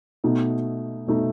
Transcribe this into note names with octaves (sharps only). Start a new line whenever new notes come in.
B2 A3 D#4
B2 A3 D#4